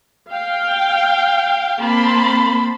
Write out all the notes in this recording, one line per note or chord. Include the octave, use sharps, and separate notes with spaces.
F5 G5
A#3 C4 A5 B5 C6